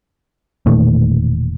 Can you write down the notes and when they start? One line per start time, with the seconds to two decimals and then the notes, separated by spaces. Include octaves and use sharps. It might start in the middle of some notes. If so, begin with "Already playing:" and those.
0.66 E1 A#2 D#3 A3